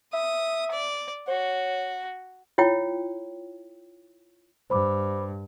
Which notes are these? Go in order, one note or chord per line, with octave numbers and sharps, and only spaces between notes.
E5 D#6
D5
F#4 C#5
E4 F4 C#5 G5
G2 C5 B5 D6